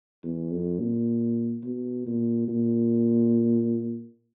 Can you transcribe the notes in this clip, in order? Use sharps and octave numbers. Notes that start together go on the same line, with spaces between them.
E2
F2
A#2
B2
A#2
A#2